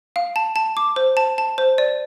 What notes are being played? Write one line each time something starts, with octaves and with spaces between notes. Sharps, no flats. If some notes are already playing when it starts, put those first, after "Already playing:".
F5
A5
A5
D6
C5
A5
A5
C5
D5